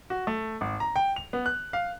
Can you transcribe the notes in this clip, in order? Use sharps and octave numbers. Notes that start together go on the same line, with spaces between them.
F#4
A3
G#1
A#5
G5
F7
B3
F#6
F5